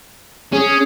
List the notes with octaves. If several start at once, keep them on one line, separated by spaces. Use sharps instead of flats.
C#4 G#4